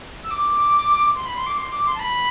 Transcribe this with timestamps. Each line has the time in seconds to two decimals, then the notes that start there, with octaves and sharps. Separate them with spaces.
0.23 E6
0.31 D6
1.15 C6
1.25 B5
1.36 C6
1.46 D6
1.58 C6
1.71 D6
1.86 C6
1.95 A5
1.99 B5